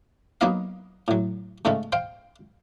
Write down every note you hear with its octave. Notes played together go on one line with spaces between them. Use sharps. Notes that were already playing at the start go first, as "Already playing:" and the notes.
F#3 A#3 B3 D#4 D#5 F5
A2 F#3
G#2 C#3 G#3 A3 C#4
C5 F5 G5